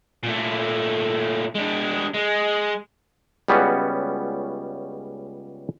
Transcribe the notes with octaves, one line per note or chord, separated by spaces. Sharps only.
A#2 A3
G#3 D4
G#3
C#2 C#3 G3 B3 C#4 F#4